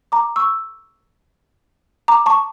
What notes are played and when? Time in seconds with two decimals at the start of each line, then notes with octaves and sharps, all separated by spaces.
0.12 A#5 D6
0.36 C#6 E6
2.08 A#5 D6
2.26 A5 C#6